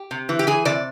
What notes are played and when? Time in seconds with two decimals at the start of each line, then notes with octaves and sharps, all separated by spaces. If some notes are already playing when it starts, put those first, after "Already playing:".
Already playing: G4
0.11 C3
0.29 E3
0.39 G4
0.47 E3 G#4
0.65 C3 D5